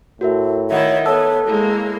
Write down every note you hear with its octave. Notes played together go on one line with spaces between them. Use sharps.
A2 F#4 A#4 E5
D#3 E4 C#5 E5 F#5
B3 A4 C#5 A5 D#6 E6
G#3 A#3 E4